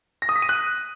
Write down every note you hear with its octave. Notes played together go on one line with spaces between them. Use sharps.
A#6
D#6
B6
D#7
F#6